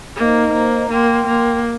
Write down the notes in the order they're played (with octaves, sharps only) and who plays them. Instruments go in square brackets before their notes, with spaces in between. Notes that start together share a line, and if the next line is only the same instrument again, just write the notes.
[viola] A#3 [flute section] D#4 C5 D#5 A#5
[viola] A#3
[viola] A#3 [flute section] A#4 G5 C6
[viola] A#3